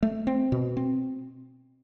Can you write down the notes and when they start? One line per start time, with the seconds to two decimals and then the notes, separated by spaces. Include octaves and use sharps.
0.03 A3
0.27 C4
0.52 B2
0.77 C4